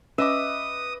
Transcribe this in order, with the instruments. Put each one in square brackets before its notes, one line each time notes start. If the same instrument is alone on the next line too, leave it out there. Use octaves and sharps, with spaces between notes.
[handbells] C#4 [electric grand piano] B4 D#5 D6 [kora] E5 [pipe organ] D#6